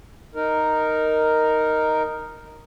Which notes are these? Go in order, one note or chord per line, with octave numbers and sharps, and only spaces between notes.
D#4 A#4